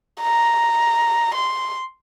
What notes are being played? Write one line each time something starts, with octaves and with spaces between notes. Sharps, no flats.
A#5
C6